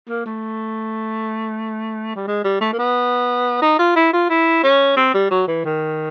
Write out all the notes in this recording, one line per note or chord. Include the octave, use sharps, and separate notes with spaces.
A#3
A3
G3
G#3
G3
A3
A#3
B3
D#4
F4
E4
F4
E4
C#4
C4
G3
F#3
E3
D#3